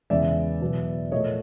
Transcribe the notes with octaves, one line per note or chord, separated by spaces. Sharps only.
E2 C#3 E3 G#3 D5 E5
E2 B2 F#3
A#2 F3 A3 C#5 D#5